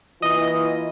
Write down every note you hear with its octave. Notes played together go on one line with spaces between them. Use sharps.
E3 A#3 E4 F4 D#5